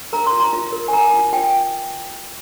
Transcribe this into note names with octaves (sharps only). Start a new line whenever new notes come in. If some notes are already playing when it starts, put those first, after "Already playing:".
A#4 A#5
C6
F4
A#5
F4
A#4
G#5
A#4 A#5
F4
F4 G5